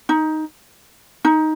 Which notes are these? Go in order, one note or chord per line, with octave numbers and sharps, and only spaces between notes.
D#4
D#4